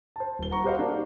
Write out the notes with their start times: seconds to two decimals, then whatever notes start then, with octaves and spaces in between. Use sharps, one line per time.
0.16 C5 A5
0.39 D#1 G7
0.51 F#5 A#5 C#6
0.64 F#4 G4 B4 C5 D#5 F5
0.79 A#3 D4 F#4
0.91 D#4 A4